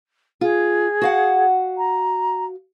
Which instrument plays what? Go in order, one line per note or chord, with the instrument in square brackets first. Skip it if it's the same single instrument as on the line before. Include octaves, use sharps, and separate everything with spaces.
[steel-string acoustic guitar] F4 [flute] G#4
[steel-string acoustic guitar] F#4 F5 F#5
[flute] A#5